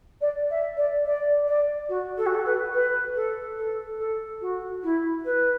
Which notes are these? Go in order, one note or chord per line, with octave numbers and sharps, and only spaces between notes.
D5
E5
D5
D5
D5
F#4
A4
F#4
A4
B4
B4
A4
A4
A4
F#4
E4
B4